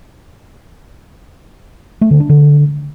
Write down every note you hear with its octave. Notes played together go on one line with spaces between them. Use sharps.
A3
D3
D4
D3